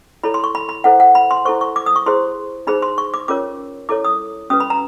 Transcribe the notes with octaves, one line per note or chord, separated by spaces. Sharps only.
E4 A4 C#5 B5
C6
C#6
B5
B5
E4 A4 C5 F#5
F#5
B5
C6
E4 A4 C5 C#6
C#6
D6
D#6
C#6
E4 G#4 C5 C6
D#4 G#4 C5 B5
C6
C#6
D6
C#4 F4 A#4 C#5 D6
E4 A4 C#5 D6
D#6
C#4 F#4 B4 D#6
B5
A#5